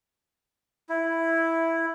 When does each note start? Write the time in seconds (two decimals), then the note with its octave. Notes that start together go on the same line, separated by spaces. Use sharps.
0.89 E4